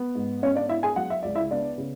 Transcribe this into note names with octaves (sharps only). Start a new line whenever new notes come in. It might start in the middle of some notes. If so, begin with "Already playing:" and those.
Already playing: B3
G#2
B3 C#4 C#5
D4 D5
D4 E4 E5
G#4 G#5
F#3 F#5
E5
C#2 D5
E4 E5
B3 D4 D5
C#3